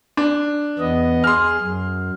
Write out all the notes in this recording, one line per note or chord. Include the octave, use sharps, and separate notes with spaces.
D4
E2 B3 D#5
G#4 C6 F6
F#2